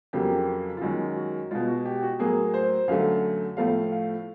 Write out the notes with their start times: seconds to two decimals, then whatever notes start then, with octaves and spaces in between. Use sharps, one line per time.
0.13 F2 C#3 F#3 A#3 G4
0.77 F4
0.81 F#2 D#3 G#3 F#4
1.16 F#4
1.51 B2 G#3 F4
1.67 F#4
1.86 G4
2.03 F#4
2.19 A2 F#3 A#3 G#4
2.54 C5
2.88 F#2 D3 F#3 A3 F5
3.57 A2 F3 A3 F5
3.92 F5